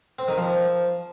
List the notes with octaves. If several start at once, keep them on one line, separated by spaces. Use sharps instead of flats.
C4
D#3
F3